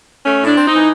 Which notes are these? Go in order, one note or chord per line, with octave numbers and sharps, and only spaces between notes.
A3 C#4
A2
D4
C4
D#4
E3